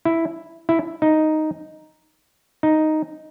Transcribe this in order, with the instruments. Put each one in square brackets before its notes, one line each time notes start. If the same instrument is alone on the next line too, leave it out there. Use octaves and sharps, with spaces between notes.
[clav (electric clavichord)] E4
E4
D#4
D#4